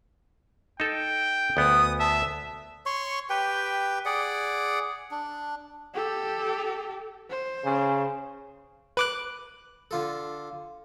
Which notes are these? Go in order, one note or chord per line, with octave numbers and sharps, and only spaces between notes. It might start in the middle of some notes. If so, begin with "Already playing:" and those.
D#4 A4 G5
D2 B3 D#6
E5 A5
C#5 C6 C#6
G4 B4 G5
G#4 D5 F#5
D4
G4 A4
C5
C#3
B4 D6 F#6
D3 F4 A4